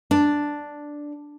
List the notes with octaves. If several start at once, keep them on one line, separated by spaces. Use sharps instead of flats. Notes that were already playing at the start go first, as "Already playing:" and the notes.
D4